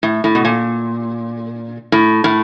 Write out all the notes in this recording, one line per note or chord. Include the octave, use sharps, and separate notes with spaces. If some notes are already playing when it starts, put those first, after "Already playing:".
A2
A2
B2
A#2
A2
A2